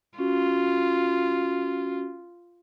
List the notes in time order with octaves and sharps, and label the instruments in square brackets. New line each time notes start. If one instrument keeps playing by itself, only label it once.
[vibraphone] C#4 F#4 [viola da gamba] F4